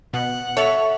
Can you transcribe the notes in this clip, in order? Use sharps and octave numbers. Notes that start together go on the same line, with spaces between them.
B2 F#5
A4 C#5 E5 E6